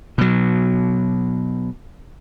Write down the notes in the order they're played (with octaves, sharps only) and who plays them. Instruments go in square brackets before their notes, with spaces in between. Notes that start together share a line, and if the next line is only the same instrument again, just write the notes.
[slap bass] B2 F#3